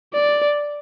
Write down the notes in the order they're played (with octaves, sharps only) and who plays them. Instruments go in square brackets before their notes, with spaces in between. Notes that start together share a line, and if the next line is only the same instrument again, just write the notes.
[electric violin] D5